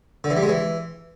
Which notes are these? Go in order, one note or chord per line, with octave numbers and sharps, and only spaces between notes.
D3
E3
G3
G#3
E3